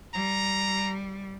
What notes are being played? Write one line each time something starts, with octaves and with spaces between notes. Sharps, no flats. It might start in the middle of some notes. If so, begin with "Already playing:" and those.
G3 A#5